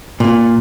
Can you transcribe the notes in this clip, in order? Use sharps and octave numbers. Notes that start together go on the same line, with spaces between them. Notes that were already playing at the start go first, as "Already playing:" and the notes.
A#2